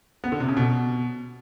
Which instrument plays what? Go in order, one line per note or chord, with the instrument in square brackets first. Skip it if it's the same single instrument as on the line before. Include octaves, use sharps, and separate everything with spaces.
[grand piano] B3
D3
C3
C#3
B2